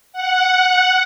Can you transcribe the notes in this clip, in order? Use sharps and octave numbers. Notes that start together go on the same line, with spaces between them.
F#5